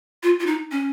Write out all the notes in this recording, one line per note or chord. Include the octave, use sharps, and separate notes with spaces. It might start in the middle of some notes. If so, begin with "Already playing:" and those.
F4
F4
D#4
C#4